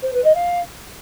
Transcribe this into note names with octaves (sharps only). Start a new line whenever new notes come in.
C5
B4
D#5
F5